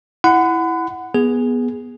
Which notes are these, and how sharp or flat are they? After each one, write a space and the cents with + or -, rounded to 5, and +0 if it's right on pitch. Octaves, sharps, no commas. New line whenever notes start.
E4 +0 F#5 +0 B5 +40
B3 -15 G#4 -5